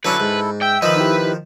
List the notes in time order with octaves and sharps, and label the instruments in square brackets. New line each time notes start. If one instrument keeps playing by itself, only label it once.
[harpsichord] D3 F#3 C#4 [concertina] E4 A4 [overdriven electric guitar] B4
[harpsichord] G#2
[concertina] E5 E6 [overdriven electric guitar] G5
[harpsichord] D#3 F3 [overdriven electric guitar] B4 [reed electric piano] D#5
[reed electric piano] D#4 E4 G4